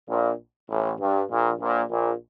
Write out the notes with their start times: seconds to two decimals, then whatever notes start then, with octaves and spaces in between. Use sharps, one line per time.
0.09 A#1 A#2
0.70 A1 A2
1.01 G2
1.30 A#1 A#2
1.60 A#1 A#2
1.90 A#1 A#2